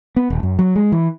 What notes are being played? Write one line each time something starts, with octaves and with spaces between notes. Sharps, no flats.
B3
D#1
F#2
F#3
G#3
E3